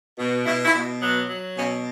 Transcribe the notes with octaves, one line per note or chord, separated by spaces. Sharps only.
B2
B2 E4
E4
B2
F#3 B3
F#3
B2 C#4